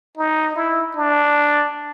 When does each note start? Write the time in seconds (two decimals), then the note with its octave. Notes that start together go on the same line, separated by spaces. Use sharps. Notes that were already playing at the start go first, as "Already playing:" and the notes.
0.17 D#4
0.56 E4
0.96 D4